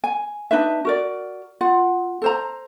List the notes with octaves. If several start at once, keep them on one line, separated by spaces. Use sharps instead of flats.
G#5
D4 D#4 B4 E5
F#4 A#4 D5
F4 F#5
A4 C5 A#5